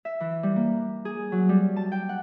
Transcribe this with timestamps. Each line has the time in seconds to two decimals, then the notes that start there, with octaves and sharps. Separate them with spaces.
0.05 E5
0.20 E3
0.43 G3
0.56 A#3
1.05 G#4
1.32 F#3
1.49 G3
1.76 A5
1.92 G5
2.09 F#5